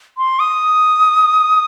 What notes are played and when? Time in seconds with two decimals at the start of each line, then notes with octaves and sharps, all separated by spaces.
0.18 C6
0.40 D#6